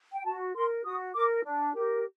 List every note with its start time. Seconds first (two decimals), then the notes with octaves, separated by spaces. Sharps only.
0.13 G5
0.25 F#4 A5
0.55 A#4 C6
0.84 F#4 D#6
1.14 A#4 D6
1.44 D4
1.74 G4 A#4